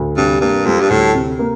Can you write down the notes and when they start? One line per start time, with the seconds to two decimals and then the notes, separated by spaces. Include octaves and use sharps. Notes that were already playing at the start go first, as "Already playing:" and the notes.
Already playing: D2
0.17 G2 C3
0.41 G2 A#3
0.66 F2 G3
0.81 G2
0.90 D2 A2
1.14 C3
1.39 A#3